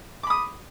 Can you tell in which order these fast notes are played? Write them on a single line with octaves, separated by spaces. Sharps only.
D6 B5 D#6